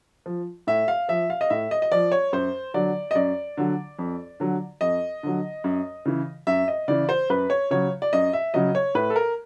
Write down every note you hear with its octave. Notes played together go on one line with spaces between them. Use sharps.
F3
A2 E5
F5
F3 E5
F5
D#5
A2 E5
D#5
D#5
F3 D5
C#5
F#2 C5
D3 F#3 D5
D#5
F#2 D5
D3 F#3
F2
D3 F#3
F2 D#5
D3 F#3
F#2
C#3 E3
F#2 E5
D#5
C#3 E3 D5
C5
F#2 B4
C#5
C#3 F#3 C#5
D5
F#2 D#5
E5
C#3 F#3 D#5
C#5
A2 B4
A4
A#4